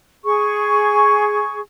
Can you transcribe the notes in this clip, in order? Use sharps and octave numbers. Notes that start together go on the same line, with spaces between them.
G#4 C#6